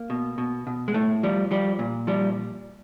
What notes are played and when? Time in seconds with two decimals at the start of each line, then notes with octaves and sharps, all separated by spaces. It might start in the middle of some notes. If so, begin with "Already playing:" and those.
Already playing: A#3
0.10 B2
0.38 B2
0.67 B2
0.88 G#3
0.94 A2 A3
1.23 F3 G3
1.51 F3 G3
1.79 A#2
2.07 F3 G3